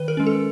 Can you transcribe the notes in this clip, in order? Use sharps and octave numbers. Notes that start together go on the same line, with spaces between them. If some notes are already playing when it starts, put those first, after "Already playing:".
Already playing: D#3 B4
A#4
G#3 C#4
A4